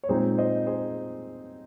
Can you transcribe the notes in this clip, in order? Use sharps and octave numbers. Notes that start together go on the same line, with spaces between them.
C#5
A#2 G#3 C4 D#4 G#4 C5
C5 D#5
G#4 C5